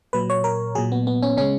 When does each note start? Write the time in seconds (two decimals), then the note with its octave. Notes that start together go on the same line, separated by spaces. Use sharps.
0.13 A#2 F#3 B4
0.30 C#5
0.44 A#4
0.75 A#2 F#3 G#4
0.92 B3
1.07 B3
1.23 C#4
1.37 C#3 G#3 C#4